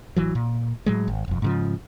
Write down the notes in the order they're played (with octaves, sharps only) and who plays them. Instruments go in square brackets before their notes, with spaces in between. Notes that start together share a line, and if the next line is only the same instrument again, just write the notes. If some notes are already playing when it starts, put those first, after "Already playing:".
[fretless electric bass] A1 E3 F#3
A#2
A2 F#3 G#3
G#1
E1 F2
G#2 C#3 F3